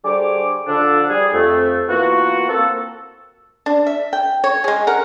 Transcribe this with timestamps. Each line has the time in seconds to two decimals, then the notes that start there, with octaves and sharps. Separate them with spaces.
0.05 D3 G3 G#4 C5 C#5 D6
0.68 D3 F3 D4 A4
1.10 G3 G#4
1.34 F2 A3
1.89 E3 A#3 B3 F4 F#4
2.49 A#3 C4 A4
3.66 D4
3.87 E5
4.13 G5
4.44 C#5
4.64 G#3 G#4
4.87 A#4 F#5